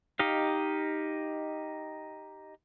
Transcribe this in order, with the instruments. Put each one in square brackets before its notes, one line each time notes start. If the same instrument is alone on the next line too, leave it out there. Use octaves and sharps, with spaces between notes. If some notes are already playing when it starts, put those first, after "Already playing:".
[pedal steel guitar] D#4 G4 D#5 F5